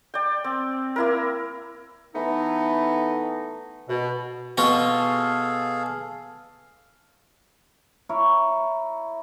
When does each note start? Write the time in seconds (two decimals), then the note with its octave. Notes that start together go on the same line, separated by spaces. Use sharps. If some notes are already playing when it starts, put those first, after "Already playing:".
0.14 D5 G5
0.44 C4
0.96 A#3 E4 A#4
2.15 E3 A3 B3 D#4
3.89 B2
4.58 B2 F4 F#4 G#4 A4 F5
8.09 E4 A#4 C#5